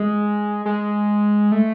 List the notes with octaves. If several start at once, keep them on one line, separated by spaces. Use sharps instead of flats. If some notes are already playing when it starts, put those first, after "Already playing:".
Already playing: G#3
G#3
A3